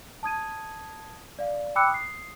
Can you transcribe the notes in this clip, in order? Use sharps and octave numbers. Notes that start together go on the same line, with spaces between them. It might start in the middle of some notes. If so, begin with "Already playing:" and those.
A5 D#6 G#6 D#7
D5 F5
G5 B5 D6 E6 F#6 C#7
D#6 C7